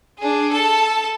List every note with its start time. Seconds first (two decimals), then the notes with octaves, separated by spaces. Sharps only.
0.19 D4 G#4
0.52 A4 A5